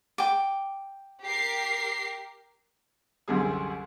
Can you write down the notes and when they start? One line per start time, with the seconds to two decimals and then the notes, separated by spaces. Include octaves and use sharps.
0.18 G5 D6
1.22 G4 A#4 C7
3.28 C2 F#2 D3 G3 G#4